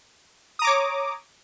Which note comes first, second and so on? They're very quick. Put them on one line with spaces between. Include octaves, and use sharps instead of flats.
D#6 A#5 D6 C#5